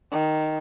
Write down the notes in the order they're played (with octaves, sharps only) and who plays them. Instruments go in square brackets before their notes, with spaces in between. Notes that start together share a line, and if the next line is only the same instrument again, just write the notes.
[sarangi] D#3